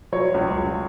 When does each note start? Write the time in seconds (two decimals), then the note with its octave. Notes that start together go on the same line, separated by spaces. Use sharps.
0.12 F#3 C#5
0.34 C#2
0.57 C#2